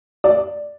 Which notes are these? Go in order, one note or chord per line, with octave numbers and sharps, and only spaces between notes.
D5